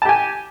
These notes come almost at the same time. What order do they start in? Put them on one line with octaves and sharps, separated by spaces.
A5 G4 G#5